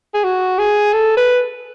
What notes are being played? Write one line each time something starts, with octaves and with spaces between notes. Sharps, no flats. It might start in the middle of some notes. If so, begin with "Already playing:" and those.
G#4
F#4
G#4
A4
B4